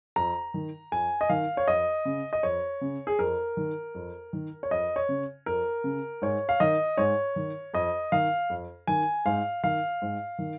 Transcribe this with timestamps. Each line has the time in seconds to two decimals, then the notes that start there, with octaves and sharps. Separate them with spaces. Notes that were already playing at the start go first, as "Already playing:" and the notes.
0.16 F2 A#5
0.54 D#3
0.92 F2 G#5
1.21 D#5
1.29 D#3 F5
1.57 C#5
1.68 F2 D#5
2.05 C#3
2.33 D#5
2.43 F2 C#5
2.81 C#3
3.07 G#4
3.19 F2 A#4
3.57 D#3
3.95 F2
4.33 D#3
4.63 C#5
4.71 F2 D#5
4.96 C#5
5.09 C#3
5.46 F2 A#4
5.84 C#3
6.22 G#2 C#5
6.49 F5
6.60 D#3 D#5
6.97 G#2 C#5
7.36 D#3
7.74 F2 D#5
8.12 D#3 F5
8.50 F2
8.87 D#3 G#5
9.26 G#2 F5
9.63 D#3 F5
10.02 G#2
10.39 D#3